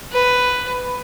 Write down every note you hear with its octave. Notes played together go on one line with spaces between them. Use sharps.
B4